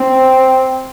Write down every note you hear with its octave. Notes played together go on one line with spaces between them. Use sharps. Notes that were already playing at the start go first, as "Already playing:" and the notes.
Already playing: C4